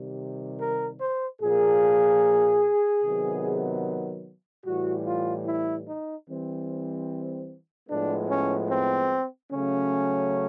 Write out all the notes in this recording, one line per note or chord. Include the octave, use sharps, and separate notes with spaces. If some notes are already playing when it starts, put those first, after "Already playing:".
Already playing: C3 D#3 G3
A#4
C5
A#2 F3 A#3 G#4
C3 D#3 F#3 B3
A2 E3 G3 F#4
F4
E4
D#4
E3 G3 C4
A2 F3 G#3 B3 D4
C#4
C4
C#3 F#3 A3 C#4